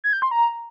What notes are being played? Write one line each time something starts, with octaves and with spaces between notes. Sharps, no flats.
G#6
G6
C6
A#5